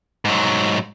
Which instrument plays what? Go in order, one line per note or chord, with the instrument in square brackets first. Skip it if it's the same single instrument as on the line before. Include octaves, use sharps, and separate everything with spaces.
[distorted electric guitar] G#2 F#3